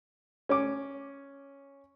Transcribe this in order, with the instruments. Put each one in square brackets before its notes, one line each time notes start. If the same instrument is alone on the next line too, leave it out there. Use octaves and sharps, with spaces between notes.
[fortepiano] C#4 D6